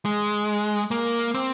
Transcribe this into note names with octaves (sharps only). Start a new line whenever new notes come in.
G#3
A#3
C4